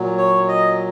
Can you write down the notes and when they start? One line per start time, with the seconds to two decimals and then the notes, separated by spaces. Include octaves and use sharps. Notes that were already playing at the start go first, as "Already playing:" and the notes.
Already playing: A#2 F#3
0.17 C#5
0.48 D#5